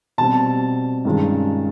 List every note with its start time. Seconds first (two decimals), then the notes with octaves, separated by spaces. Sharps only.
0.18 B2 G3 C4 A5
1.05 G2 D#3 G#3 C#4 F4